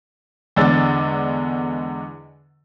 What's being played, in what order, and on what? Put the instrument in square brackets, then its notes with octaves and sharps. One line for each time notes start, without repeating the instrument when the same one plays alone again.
[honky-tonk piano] E2 D3 G#3 D5 E6 A6